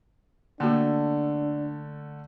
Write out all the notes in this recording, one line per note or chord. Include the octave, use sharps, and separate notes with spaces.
D3 A3 A#3 D4 F#4